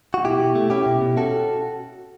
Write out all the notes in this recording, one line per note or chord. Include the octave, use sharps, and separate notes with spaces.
F#4
B2 E4 G4
B2
A3
C#4 E4 G4
B2
B2
C#4 F#4 A4